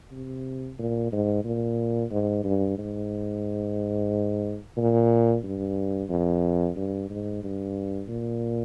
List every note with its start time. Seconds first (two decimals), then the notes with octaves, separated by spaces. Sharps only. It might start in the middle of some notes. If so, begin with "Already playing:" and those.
0.12 C3
0.79 A#2
1.12 G#2
1.45 A#2
2.11 G#2
2.44 G2
2.78 G#2
4.77 A#2
5.44 G2
6.10 F2
6.77 G2
7.10 G#2
7.43 G2
8.09 A#2